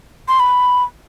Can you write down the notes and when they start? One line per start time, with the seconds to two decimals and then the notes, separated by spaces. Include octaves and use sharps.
0.28 C6
0.40 B5